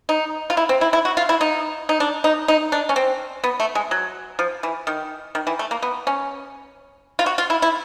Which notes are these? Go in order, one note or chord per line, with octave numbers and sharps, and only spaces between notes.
D#4
F4
E4
C4
E4
E4
F#4
F4
E4
D#4
D#4
D4
D#4
D#4
D4
C#4
C4
B3
A3
G#3
F#3
F3
E3
D#3
D#3
E3
A3
A#3
B3
C#4
F4
F#4
F4
E4
E4